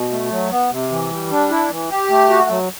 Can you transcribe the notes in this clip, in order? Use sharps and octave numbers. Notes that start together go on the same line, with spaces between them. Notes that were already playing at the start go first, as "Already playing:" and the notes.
Already playing: B2
A3
F#3
B3
C3
E3
G3
D4
E4
E3
G4
A3
F#4
F#3